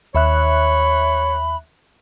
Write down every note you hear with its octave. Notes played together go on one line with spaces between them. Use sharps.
D#2 C#5 E5 B5 F#6